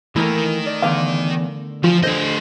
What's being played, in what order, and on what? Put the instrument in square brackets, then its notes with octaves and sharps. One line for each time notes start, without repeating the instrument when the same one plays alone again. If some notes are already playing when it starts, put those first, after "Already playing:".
[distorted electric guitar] D#3 [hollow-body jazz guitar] E3 A#3 [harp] A3 A#4
[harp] D5
[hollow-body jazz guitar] E2 B4 F5 [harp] D3 D6
[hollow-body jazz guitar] E3 F4 [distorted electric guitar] F3
[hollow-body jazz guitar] D3 A4 C5 [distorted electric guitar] A3 D#5